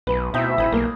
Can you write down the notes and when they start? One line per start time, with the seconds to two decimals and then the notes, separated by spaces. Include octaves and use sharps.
0.07 B1 B4 B5
0.34 D2 B2 C4 D#4 E4 E5 G5
0.58 G#1 D#5 G#5 B5
0.72 B1 A#3